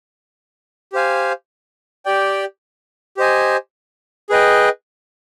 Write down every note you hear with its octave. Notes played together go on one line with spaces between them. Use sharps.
G4 C5 F5 G#5
G4 D5 G5
G4 C5 D#5 G#5
G#4 B4 D#5 G5